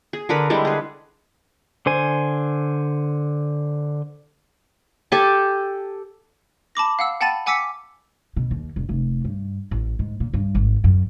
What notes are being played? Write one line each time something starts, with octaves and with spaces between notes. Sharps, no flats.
G#4
D3 A#4 B4 B5
D3 G3 G#3 E4
G#4 B4
D3 C5 G#5
G4 A4 G#5 A5
A5 B5 D6 A#6
F5 F#5 E6
F#5 G5 A5 B5 A6 D#7
F#5 G#5 D6 E6 B6 C#7
B2
D#2
E1
F1
G2
A1
G#2
A#2
G2
G#1
F#2